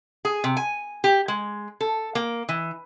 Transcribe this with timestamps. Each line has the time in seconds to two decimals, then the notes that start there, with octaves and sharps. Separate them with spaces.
0.25 G#4
0.44 C3
0.57 G#5
1.04 G4
1.28 G#3
1.81 A4
2.15 A#3
2.49 E3